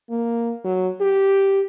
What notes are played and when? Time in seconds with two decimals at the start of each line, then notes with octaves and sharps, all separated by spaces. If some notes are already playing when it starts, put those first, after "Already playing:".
0.10 A#3
0.64 F#3
1.01 G4